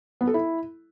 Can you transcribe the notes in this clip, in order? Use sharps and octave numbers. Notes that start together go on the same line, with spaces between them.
B3
A4
E4